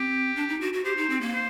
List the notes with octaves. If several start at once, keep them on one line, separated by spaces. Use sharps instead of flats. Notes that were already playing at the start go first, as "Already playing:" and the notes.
Already playing: C4 G4
D4
D#4
F#4
F#4
G4 C5
D#4
C4
A#3
C5